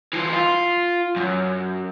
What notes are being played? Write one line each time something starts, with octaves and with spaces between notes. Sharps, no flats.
E3 F4
F4
F#2